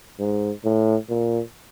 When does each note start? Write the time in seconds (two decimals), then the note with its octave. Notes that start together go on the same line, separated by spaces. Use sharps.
0.19 G#2
0.64 A2
1.09 A#2